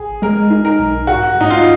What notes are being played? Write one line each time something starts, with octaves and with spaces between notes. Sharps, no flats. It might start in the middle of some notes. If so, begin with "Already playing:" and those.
Already playing: G#1 G#4
G#3 A#4
D#4
A#4
B1
G#2 F#4
G#2 D#4
F4